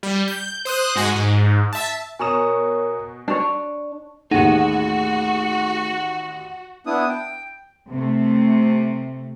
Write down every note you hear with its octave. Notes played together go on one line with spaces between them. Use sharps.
G3
G6
C5 D#6 F#6
G#2 G#3 F#4 G#5
G#2
E5 A5
B2 A#4 C#5 G#5 A#5 C#6 D#6 E7
D4 C#5
A1 D#2 A3 D#4 F#4 G#4 F#5
B3 D4 E4 D#6
G5
C3 A3